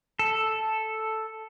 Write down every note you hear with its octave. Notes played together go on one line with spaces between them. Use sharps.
A4